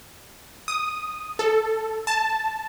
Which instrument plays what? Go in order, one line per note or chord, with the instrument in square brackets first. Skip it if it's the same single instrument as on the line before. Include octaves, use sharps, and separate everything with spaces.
[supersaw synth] D#6
A4
A5